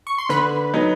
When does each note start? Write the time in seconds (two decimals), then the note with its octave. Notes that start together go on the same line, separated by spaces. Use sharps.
0.07 C#6
0.18 C6
0.29 D3 B4 B5
0.74 F#3 B3 D#4